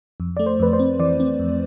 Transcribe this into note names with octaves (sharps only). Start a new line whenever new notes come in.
F2
A3 D5
C5
F2 B4
C5
C4
E3 D5
C4
F2